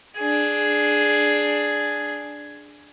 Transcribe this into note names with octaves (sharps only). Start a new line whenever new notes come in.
D4 G#4